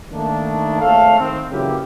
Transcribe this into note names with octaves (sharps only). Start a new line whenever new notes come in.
D#3 A3 A#3 D4
G#1 A3 A4 C#5 E5 F5
D#3 C4
C#3 E3 F#3 A#3 E4 G4